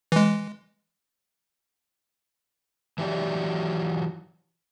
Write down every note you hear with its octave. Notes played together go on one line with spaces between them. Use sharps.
E3 G#3
E3 F#3 E4 G4 D5